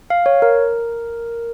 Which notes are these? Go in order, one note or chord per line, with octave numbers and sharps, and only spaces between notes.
F5
C#5
A#4